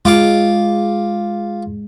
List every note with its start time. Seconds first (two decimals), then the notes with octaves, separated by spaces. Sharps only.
0.05 G#3 F4 D6